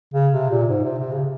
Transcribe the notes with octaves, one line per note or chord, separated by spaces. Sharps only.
C#3
C3
A#2
G#2
C3
C3
C#3